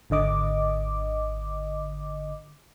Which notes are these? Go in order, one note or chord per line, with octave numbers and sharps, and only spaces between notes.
G#1 D3 D#5 D6